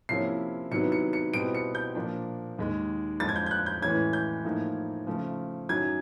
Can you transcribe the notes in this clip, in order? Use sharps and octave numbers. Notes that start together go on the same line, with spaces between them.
C3 F3 A#3 C#4 E4 C7
C3 D#3 F#3 B3 E4 C#7
C#7
C#7
B2 G3 C4 E4 D7
C#7
G6
A#2 F3 A#3 D4
D#2 D#3 G#3
F2 D3 F3 G#3 A6
G#6
G6
G6
F#6
G6
A2 E3 G#3 C#4 G#6
G6
A2 F3 A#3 D#4
C#3 F3 A3
F#2 D#3 F#3 G#6